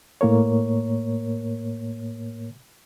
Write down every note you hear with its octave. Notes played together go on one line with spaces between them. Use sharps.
A2 A#3 A#4 C#5